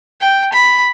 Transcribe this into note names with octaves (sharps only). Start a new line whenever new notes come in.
G5
B5